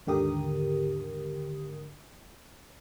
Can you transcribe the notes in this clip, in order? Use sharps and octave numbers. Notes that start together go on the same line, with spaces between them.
D#2 G#2 D3 G4 A#4 D#6